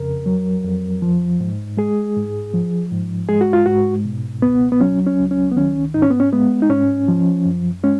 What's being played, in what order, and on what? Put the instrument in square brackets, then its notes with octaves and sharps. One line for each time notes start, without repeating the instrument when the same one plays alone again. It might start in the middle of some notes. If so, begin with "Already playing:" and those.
Already playing: [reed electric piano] F2 C#3 A#4
F#3
F2
F3
G#2
G#3 G#4
G#2
F3
G#2
G#3 G#4
F#4
F4
G#2 F#4
B2
C#2 B3
B3
F#3 C#4
C#4
C#2
C#4
B3
D#3 C#4
G#2 D#4
C#4
B3
C#4
G#3 B3
D#4
G#2 C#4
F3
F#2
G#3 C#4